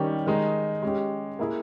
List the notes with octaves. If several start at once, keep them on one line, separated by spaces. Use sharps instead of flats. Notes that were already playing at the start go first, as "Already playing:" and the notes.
Already playing: D#3 G3 C#4 G4 C#5
D#3 G#3 D#4
G#3 C#4 G4
A#3 E4 G#4